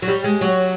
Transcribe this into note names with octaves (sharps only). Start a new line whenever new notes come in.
F#3
G3
G#3
F#3